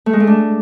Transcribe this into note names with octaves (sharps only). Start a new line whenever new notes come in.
A3
G#3
A3
D4